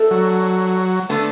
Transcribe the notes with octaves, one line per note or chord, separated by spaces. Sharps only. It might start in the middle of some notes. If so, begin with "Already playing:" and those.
Already playing: A3 D4 A4
F#3
D3 A3 B3